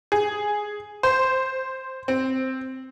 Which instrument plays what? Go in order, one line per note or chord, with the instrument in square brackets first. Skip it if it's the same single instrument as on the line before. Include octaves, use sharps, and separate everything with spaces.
[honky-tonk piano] G#4
C5
C4